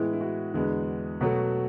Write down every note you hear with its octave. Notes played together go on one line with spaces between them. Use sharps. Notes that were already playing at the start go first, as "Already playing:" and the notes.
Already playing: A2 E3 G#3 B3 E4
E4
F#4
E2 D3 G#3 B3
B2 F#3 A3 F#4